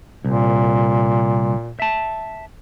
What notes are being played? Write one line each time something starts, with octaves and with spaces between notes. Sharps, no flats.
C2 A#2
E5 A5